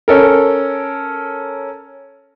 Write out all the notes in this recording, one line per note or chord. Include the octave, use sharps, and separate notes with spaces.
C#4 A4 A#4